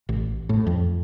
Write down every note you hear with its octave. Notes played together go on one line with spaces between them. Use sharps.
A1
A2
F2